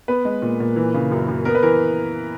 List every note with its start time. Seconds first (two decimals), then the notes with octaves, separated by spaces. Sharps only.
0.08 B3 B4
0.25 G#3
0.42 A#2
0.60 A#2
0.76 E3
0.94 C#3
1.11 F#2
1.28 F#2
1.45 B3 A#4
1.55 B4
1.63 E3 A#4